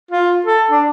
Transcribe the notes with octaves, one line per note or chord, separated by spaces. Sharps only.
F4
A4
D4